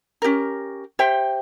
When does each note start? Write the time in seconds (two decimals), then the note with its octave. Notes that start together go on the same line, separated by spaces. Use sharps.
0.22 C#4 G4 A#4
0.99 G4 C5 E5 G5